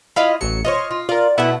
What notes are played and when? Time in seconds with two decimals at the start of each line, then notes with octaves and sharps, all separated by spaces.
0.16 E4 F4 D#5 F5 B5
0.41 A1 F#3 C#7
0.65 F4 C5 C#5 D#5
0.91 F4
1.09 F4 A#4 D5
1.38 B2 A3 B3 E4 F#5